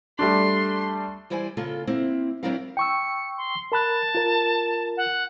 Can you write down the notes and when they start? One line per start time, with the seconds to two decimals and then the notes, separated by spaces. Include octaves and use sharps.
0.19 G3 A3 D4 C6
1.30 E3 G3 E4 C5 D5 G#5
1.57 C#3 A#3 F4 A4
1.87 A#3 C4 E4
2.43 F#3 C4 D4 E4 A#4 F5
2.77 G5 C#6 E6 C#7
3.37 C6
3.72 A#4 A5 B5 F#6
4.15 F4 A#4
4.97 F#5